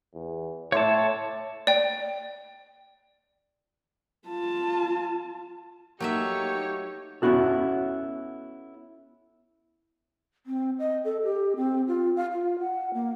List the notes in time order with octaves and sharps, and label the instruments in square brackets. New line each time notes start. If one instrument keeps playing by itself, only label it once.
[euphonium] E2
[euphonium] A2 [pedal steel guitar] C#5 A5 [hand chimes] E5 C6 D6
[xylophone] D5 G5
[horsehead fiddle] F4 A5
[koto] F#3 A3 E5 [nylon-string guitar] A#3 [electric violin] D#4 C#5 [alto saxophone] G4
[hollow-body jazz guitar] B3 C#4 E4 F#4 A4
[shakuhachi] C4
D#5
A4
G4
C4
F4
F5
F4
F#5
A#3